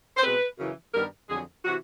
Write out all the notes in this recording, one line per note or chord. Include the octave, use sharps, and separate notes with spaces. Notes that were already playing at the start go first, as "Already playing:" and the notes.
C5
B2 G#3 C4 B4
F#2 C#3 E3
G2 D#3 G3 B3 A#4
F2 D3 F#3 G#4
C3 E3 F#4